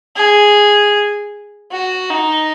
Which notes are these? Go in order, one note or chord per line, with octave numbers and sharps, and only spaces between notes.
G#4
F#4
D#4